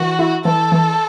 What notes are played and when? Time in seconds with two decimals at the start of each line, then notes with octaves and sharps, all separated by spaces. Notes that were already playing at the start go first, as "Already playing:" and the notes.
Already playing: E3 F#4
0.19 E4
0.45 E3 A4
0.72 E3